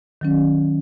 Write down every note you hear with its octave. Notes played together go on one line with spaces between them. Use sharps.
D#3 F#3 C#4